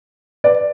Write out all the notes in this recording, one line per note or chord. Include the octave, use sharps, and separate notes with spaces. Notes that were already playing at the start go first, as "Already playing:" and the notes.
B4 D5